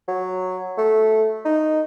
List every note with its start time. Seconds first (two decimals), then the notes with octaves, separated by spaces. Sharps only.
0.08 F#3
0.78 A3
1.45 D#4